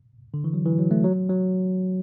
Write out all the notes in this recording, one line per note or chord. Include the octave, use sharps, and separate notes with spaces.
D3
E3
F#3
E3
F#3
A3
F#3
F#3